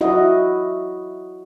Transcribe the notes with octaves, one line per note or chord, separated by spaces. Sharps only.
E4 F#4 D#5